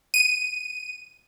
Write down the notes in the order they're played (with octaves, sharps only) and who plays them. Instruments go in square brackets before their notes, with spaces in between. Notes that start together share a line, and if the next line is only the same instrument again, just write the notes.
[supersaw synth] D#7